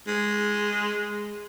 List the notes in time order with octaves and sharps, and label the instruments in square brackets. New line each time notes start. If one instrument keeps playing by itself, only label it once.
[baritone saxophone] G#3